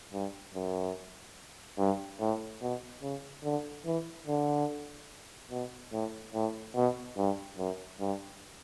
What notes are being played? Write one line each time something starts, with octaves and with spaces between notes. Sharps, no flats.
G2
F#2
G2
A2
B2
C#3
D3
E3
D3
B2
A2
A2
B2
G2
F#2
G2